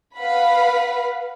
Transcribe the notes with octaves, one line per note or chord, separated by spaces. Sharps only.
B4 F5 F#5 B5